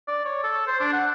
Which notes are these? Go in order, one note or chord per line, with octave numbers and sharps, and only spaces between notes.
D5
C#5
A4
C5
D4
F#5